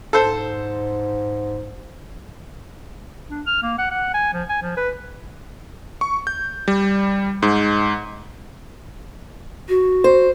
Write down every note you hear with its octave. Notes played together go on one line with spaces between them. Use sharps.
G#2 A4 C5
D4
F6
A#3
F#5
F#5
G#5
F3
G#5
F3
B4
C#6
G6
G3
G#2
F#4
C5